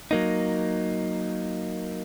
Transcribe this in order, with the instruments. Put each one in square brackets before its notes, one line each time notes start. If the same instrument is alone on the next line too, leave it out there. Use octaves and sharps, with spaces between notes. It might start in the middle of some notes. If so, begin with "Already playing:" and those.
[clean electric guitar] F#3 A#3 D#4